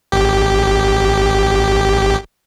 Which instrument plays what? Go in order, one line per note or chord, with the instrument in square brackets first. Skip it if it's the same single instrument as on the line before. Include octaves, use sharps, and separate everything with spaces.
[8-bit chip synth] G#1 G4